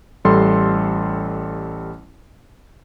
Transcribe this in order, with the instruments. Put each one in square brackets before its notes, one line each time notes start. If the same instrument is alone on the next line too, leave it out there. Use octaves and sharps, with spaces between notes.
[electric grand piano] A1 G3 A4 C6